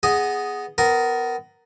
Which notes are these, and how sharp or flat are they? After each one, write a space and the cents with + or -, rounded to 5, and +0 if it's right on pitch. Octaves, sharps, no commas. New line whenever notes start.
B3 +0 G#4 +0 D#5 +0
B3 +25 A#4 +0 A#5 +0